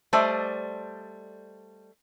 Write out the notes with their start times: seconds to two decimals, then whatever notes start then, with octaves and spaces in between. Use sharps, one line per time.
0.13 G3 A3 C5 D5 D#5